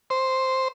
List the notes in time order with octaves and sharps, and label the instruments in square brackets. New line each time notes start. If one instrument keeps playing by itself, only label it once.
[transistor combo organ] C5